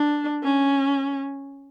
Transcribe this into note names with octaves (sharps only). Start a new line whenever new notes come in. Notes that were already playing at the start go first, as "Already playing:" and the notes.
Already playing: D4
C#4